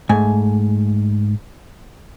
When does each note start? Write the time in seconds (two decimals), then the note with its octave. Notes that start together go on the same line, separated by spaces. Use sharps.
0.09 G#2 A3 G#5